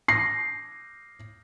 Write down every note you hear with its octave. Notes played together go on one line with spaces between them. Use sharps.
A#6 C7